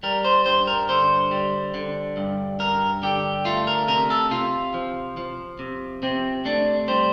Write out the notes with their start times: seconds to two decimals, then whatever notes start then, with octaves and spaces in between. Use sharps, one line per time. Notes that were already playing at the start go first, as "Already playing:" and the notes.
0.03 G3 A#4
0.24 C5
0.46 G2 C5
0.67 A#4
0.89 D3 C5
1.31 G3
1.74 D3
2.17 G2
2.60 G2 A#4
3.03 D3 G4
3.45 A3 F4
3.67 A#4
3.88 C3 A#4
4.10 A4
4.31 C3 F4
4.74 F3
5.17 F3
5.59 C3
6.02 C3 C4
6.45 A3 D4
6.88 G3 C5